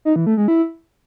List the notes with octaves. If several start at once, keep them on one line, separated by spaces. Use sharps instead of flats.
D#4
E3
A3
G#3
E4